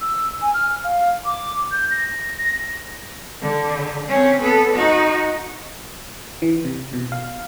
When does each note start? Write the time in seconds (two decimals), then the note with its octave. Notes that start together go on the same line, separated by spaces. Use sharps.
0.01 E6
0.41 G#5
0.54 F6
0.84 F5
1.25 D6
1.72 G6
1.91 A#6
2.38 A#6
3.42 D3
4.08 C4 C#4
4.42 B3 A4
4.75 D#4 F#4
6.42 E3
6.65 C3
6.93 B2
7.12 F5